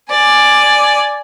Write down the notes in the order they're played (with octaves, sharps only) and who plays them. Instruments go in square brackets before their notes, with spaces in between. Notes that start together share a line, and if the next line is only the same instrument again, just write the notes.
[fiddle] D5 G#5